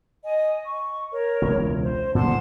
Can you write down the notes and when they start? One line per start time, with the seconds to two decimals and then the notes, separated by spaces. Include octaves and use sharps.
0.24 D#5 G#5
0.63 C#6
1.12 A#4 C#5
1.42 E1 C#2
1.81 C5
2.15 A#2 D3 F3 F#5 A5 C6